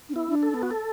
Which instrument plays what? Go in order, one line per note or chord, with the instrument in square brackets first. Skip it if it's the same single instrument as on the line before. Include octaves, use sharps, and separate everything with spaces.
[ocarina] D4
[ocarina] B3 [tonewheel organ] E4
[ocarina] D4
[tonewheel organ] A4
[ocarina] D4
B3
[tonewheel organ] F#4
A4